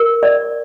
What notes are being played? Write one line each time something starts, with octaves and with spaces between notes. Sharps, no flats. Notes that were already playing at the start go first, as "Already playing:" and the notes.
Already playing: A#4
D5